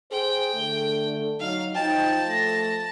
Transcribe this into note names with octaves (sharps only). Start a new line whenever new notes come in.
G#4 C5 G5
D3 A3
F#3 D#4 F5
F3 D#4 G5 A5
A3 A#6